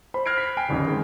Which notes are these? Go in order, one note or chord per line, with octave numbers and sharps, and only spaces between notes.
C5 B5
F6 F#6 G#6 A#6 C7 D7
B6 C7
G5 G#5 B5 C7 D7
D1 A1 D#2 D#4
D#3 G#3 C4